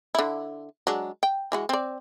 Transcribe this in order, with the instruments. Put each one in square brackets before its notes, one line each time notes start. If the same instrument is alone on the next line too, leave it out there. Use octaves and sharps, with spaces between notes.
[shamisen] D3 E4
F#3 G#3 D4
G5
E3 G#3 F#4
C4 D5